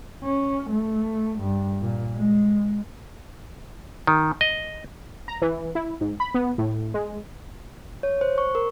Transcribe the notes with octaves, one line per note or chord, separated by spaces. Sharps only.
C#4
A3
G2
A#2
G#3
D#3
D#5
A#5
E3
E4
G#2
B5
B3
A2
G#3
C#5
C5
C#6
A#4